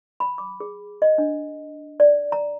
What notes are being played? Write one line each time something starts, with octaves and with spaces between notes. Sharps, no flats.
B5
D6
G#4
D#5
D4
D5
A#5